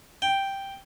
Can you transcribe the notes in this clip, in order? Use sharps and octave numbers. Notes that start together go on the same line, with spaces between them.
G5